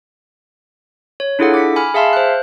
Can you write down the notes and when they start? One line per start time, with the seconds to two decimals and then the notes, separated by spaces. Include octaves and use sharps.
1.20 C#5
1.39 D4 E4 F4 G#4 A4 F#5
1.54 D6 B6
1.76 G#5 B5 F6
1.94 G#4 E5 F5 A5 C6 F6
2.13 C5 F#6